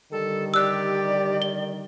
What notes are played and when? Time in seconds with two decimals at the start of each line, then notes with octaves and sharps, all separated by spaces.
0.12 D3 D#3 G3 A4
0.54 G4 D5 E6 F#6
1.42 G7